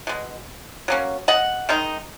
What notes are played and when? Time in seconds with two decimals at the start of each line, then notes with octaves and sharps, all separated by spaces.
0.07 B2 G#3
0.88 F#3 A#3 C#4
1.28 D#5 F#5
1.69 D#3 G#3 D#4